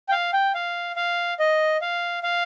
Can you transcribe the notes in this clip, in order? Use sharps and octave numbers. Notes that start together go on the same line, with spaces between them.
G5
F5
G5
F5
F5
D#5
F5
F5